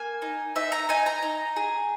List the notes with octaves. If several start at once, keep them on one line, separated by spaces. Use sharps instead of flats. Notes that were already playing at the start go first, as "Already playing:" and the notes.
Already playing: A#3 G#5
D#4
D#4 E5
A#5
D#4 G#5
A#5
D#4
G#4